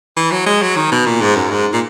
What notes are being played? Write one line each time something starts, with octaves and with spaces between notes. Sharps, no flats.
E3
F#3
G#3
F#3
D#3
B2
A#2
G#2
F#2
G#2
A#2